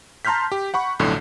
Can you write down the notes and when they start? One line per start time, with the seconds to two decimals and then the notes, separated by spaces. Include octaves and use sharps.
0.25 A5 A#5 C6 F6 G6 B6
0.52 G4
0.74 F#5 B5 C#6
0.99 B1 F2 A2 D3